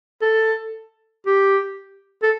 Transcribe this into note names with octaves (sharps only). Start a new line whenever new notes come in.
A4
G4
A4